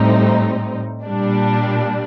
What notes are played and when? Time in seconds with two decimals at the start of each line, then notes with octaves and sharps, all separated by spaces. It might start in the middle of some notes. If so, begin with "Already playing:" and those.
Already playing: A2 G3 C4 D#4
1.04 A#2 G3 D4